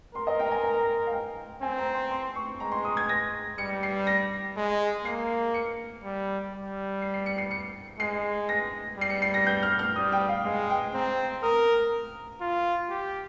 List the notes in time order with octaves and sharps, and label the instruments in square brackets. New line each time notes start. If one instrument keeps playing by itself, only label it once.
[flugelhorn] A#4 [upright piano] C6
[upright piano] D#5
G5
A#5
G#5
G#5
F5
G5
[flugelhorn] C4 [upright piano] G#5
[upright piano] A#5
C6
C6
C#6
[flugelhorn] G#3 [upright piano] A#5
[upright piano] C6
D#6
G#6
A#6
[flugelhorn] G3 [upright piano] C#7
[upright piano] C7
A#6
[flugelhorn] G#3
[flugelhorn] A#3 [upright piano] C7
[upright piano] C#7
[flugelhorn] G3
G3
[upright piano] C7
C7
C#7
C7
C#7
[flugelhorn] G#3 [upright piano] C7
[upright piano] A#6
[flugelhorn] G3 [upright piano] C7
[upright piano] C#7
C7
A#6
G6
F6
F6
[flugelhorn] G3 [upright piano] D#6
[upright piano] G5
F5
[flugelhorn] G#3 [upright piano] F5
[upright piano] G5
[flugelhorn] C4 [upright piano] A#5
[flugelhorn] A#4 [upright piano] D#6
[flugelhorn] F4
G4